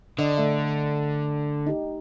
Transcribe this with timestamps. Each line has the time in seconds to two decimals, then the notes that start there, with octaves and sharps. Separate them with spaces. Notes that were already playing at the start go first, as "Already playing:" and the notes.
0.19 D3 D4 D#5
0.38 A3 E5
1.66 D#4 G4